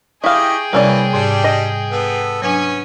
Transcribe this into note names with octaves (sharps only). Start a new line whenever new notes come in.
E4 G4 G#4 D#5 F5 G5 C#6
C3 E3 G3 A#3 C#4 B4 D5
G#2 G3 D4
D#5
B3 A4
F#3 B3 C#4 D4 G#5 C#6